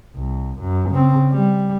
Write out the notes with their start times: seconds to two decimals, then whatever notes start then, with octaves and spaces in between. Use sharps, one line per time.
0.16 C2
0.61 F#2
0.91 C#3 C4
1.31 G3